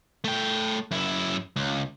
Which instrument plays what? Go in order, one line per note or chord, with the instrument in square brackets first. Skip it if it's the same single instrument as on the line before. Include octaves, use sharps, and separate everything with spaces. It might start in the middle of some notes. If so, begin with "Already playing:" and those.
[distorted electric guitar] A3 G5
F#2 E4
C#2